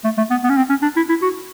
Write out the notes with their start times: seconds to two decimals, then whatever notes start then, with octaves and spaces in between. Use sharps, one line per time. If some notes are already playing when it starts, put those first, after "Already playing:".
0.04 A3
0.17 A3
0.30 B3
0.44 B3
0.49 C#4
0.57 C4
0.69 C#4
0.82 D4
0.96 E4
1.09 E4
1.22 F#4